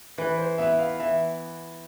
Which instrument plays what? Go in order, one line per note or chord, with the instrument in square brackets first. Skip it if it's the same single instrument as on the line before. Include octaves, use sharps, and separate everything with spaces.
[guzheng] E3 [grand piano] B4
[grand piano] C5
[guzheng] B3 E4 [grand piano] E5
[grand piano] F5
[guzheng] E3 [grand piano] E5